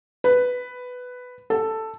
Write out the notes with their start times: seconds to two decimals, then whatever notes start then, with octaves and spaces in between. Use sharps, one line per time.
0.24 B4
1.50 A4